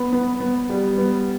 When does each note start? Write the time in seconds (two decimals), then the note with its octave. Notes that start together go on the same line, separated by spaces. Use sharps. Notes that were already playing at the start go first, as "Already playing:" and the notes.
Already playing: B3
0.12 B3
0.40 B3
0.69 G3
0.98 B3